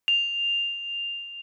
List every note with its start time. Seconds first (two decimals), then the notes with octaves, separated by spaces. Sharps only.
0.08 F7